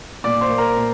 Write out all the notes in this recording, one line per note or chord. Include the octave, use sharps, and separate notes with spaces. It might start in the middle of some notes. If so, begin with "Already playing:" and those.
A#2 D5 D6
C5 C6
A#3
A#4 A#5
A#2